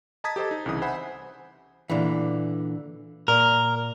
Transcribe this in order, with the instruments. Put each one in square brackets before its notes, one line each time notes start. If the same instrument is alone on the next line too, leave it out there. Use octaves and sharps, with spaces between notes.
[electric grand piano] D#5 A5 A#5 D#6 G#6 B6
G4 A4 C5 D#5 A5
D#4
C2 C#3 E3 D#6
C5 E5 F#5 G#5 B5
[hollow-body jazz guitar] A#2 D3 E3
[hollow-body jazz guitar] A#2 [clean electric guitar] A#4